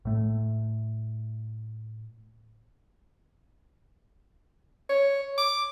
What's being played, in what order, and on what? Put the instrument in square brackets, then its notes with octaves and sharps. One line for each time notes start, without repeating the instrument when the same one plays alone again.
[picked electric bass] A2 A3
[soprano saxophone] C#5
D6